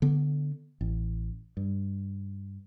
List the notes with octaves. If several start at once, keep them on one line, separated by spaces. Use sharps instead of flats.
D3 B3
A1
G2